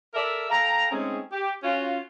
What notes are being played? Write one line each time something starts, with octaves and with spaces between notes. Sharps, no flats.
A4 A#4 D5 E5
A4 F5 G5 A#5
G#3 A3 C4 C#4 D#4 G#4
G4
C#4 F4 F#4